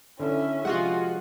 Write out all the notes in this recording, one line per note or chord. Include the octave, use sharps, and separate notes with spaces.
D3 C#4 E4 A4 E5
C3 F3 G#3 F4 F#4 G#4 F#5